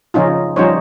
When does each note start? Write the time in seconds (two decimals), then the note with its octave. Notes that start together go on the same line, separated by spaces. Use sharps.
0.14 C#3 F3 C#4 D#4 F4
0.56 F3 G3 C#4 D#4 C5 C#5